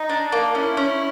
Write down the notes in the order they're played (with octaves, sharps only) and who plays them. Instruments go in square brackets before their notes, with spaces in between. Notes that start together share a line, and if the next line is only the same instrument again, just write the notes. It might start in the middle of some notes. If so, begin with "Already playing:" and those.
Already playing: [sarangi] D#4
[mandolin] D4
A#3
[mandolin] C#4 [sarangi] E4
[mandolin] C#4